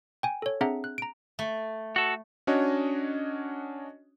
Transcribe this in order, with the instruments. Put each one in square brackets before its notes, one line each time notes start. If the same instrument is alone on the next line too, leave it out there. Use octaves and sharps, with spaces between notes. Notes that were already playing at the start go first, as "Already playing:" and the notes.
[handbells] G5 G#5
A4 C#5
C4 D4 G#4 E5 F#5 A#5
F#6
A#5 D7
[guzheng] A3
[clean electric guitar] F#4 A4
[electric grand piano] C#4 D4 F#4 C#5 D#5